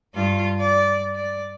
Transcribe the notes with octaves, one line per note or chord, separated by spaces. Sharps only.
G2 F4
D5
D5